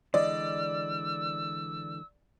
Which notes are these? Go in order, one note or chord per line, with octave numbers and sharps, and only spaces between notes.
D3 E3 G#3 D5 D#5 E6